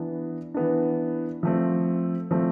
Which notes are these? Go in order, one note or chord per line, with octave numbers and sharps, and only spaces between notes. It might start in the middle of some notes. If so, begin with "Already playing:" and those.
Already playing: E3 B3 D4
E3 B3 D4
F3 A3 C4
F3 A3 C4